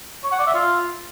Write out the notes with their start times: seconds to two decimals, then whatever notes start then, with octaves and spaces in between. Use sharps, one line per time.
0.24 C#5
0.31 F#5
0.39 D5
0.47 E5
0.54 F4